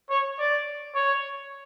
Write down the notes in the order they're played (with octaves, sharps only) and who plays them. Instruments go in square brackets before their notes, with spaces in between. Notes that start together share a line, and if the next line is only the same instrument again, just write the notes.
[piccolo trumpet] C#5
D5
C#5